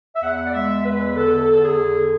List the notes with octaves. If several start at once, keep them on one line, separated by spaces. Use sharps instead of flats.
E5
E2 F#5
D5
G#3 E5
E2 B4
D3 A4
E2 A4
G#4
D3